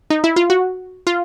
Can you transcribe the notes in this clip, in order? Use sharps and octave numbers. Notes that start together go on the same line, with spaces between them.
D#4
E4
F4
F#4
F4